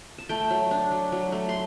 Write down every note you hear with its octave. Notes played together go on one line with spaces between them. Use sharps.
A5
A3 G5
F#3
D4
F#3
F#3
A3
C6